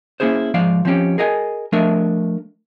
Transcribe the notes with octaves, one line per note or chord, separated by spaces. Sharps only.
A#3 C#4 E4 G#4 C5
G#2 F3 D5 F5
F3 C4 C#4 G4
G#4 A#4 D#5 F5 G#5
F3 A3 D4 A#4 D#5 E5